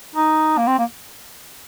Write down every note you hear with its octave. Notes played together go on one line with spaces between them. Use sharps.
D#4
A#3
C4
A#3